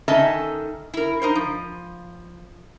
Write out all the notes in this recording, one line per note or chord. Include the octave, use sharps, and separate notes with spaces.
D#3 C#4 A4 D#5 E5 A5
E4 A#4
D#4 A#4 C5
F3